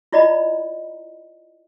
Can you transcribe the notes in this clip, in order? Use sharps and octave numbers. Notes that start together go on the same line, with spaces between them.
E4 F4 D5 D#5 A#5 B5